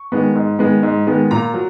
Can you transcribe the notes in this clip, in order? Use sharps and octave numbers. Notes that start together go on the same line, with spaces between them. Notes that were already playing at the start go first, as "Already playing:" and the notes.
Already playing: C#6
D#3 G#3 B3
G#2
D#3 G#3 B3
G#2
D#3 G#3 B3
A#2 A#5
F#3